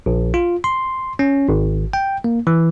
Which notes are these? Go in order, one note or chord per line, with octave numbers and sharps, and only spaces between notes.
A#1
F4
C6
C#4
G#1
G5
A#3
E3